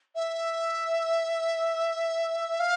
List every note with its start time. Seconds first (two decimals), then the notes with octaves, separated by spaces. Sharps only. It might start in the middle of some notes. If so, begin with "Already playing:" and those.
0.15 E5
2.59 F5